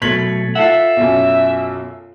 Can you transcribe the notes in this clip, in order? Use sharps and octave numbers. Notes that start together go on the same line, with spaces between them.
B2 F#3 A3 G#6 B6 F#7
F4 A4 E5 F#5
B1 F#2